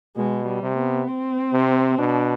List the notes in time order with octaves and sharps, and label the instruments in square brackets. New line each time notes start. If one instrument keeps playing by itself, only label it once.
[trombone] B2 [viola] G#3
[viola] G3
[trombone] C3
[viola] B3
C4
[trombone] C3
[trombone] B2 [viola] D4